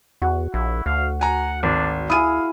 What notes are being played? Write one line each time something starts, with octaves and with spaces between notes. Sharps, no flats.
E2 F#4
A#1 E4
D2 F5
F#5 G#5 A#5
G#1 D4
E4 G#4 F5 D#6 D#7